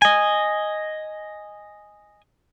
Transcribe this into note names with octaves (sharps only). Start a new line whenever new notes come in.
D#5 G#5